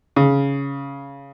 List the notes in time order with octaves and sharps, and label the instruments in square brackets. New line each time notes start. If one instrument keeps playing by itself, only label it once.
[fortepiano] C#3